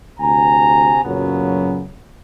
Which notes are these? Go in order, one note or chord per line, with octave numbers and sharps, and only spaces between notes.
D2 C3 G#5 A#5
F#2 A#2 C#3 F#3 B3